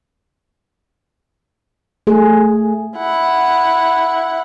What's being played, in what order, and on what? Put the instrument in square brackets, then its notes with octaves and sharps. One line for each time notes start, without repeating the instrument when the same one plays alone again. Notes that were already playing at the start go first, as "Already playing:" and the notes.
[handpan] A3 G#4
[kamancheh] E4 F#5